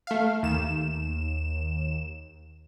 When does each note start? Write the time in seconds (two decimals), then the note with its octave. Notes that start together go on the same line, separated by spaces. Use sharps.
0.07 A3 F5
0.43 D#2 E7